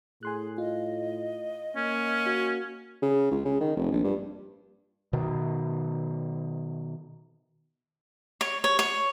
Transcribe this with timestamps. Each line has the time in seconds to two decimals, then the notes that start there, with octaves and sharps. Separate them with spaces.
0.23 A2 G#4 G#5 C6 F#6
0.58 F4 D#5
1.76 A#3 C#4
2.26 F#4
3.02 C#3
3.31 C#2
3.45 C#3
3.61 D#3
3.77 F1
3.92 A#1
4.04 G2
5.13 B2 D#3
8.41 C#5
8.64 C#5
8.79 C#5